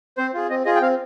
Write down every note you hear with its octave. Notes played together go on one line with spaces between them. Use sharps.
C4 C5
F4 G#4
C4 D#5
F4 G#4 D#5
G5
C4 F5